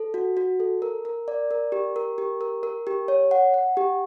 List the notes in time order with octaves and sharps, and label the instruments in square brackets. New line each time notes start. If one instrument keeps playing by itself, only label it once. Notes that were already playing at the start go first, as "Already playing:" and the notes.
Already playing: [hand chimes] A4
F#4
F#4
A4
A#4
A#4
D5
A#4
G4
A#4
G4
A#4
A#4
G4
C#5
F#5
F#5
G4